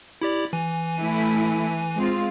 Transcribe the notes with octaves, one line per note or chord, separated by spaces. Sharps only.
E4 G4 D5
E3 G#5
A3 E4
G#3 C4 F4